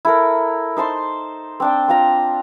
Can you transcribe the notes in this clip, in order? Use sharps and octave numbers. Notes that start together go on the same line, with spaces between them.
E4 A4 A#4
D#4 C5 A5 C6
C4 D4 G5
C4 F4 A#5